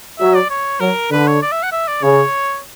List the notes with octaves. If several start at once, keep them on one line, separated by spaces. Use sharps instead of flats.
F#3 E5
D5
C#5
F#3 A#4
D3 B4
C#5
D5
E5
F#5
E5
D5
C#3 C#5